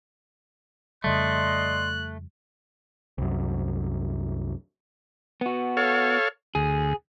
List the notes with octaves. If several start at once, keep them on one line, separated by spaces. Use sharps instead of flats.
F2 C#3 G3 A3 D5 D#5 C6 F#6
C2 F#2
B3 F#4
A4 C#5 F5
D2 G#4